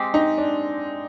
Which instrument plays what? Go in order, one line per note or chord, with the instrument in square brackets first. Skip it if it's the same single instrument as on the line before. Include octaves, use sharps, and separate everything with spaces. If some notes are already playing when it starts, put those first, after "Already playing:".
Already playing: [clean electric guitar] G#3 C4 G4
[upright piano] D#4
D4